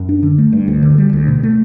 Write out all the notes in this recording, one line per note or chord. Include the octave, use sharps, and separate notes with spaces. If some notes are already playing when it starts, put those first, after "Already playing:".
Already playing: F#2
D4
D3
A3
G2
D2
D3
G3
D2
B2
A3